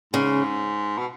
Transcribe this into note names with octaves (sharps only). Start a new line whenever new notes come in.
G#2 C#3
B2